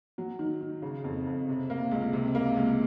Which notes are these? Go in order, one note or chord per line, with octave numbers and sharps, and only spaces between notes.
F#3
D#3
D#3
C#3
F2
F2
C3
A#3
C#2
C3
A#3
C#2